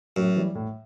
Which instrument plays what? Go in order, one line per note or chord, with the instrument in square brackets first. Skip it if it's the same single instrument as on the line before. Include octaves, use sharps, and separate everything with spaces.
[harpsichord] F#2 [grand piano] A2
[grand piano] E3 G3
A2